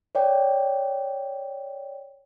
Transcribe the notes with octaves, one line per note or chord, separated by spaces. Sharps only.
C#5 D5 G5